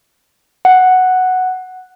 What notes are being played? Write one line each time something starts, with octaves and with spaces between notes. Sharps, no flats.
F#5